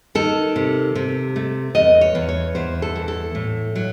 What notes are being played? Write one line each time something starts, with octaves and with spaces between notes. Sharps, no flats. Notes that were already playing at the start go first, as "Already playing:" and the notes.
D#3 A4
C3
C3
A3
E2 D#5
C#5
E2
C#5
E2 C5
A4
E3
A4
A2
F#3